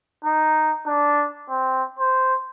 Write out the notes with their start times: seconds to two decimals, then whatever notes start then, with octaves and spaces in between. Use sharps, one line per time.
0.24 D#4
0.87 D4
1.49 C4
1.99 C5